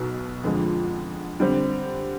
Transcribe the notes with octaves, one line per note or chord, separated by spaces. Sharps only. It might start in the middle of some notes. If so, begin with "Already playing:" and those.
Already playing: B1 B2 B3
F2 D3 F3 G#3
D3 G3 C4